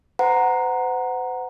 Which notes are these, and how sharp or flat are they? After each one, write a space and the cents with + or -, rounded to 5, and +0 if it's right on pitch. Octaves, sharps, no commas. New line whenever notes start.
C5 -45 F#5 +0 A#5 +0